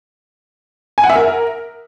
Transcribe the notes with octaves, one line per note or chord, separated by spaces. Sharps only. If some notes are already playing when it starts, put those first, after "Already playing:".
G#5
F#5
E5
A#4